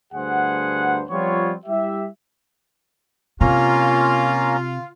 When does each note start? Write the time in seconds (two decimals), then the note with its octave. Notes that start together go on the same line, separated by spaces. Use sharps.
0.14 D2 G2 G#4 C5 F#5
1.10 F3 G3 B3 C4 F4 C#5
1.66 G3 E4 G4 E5
3.41 C3 A#3 C#4 F4 A#5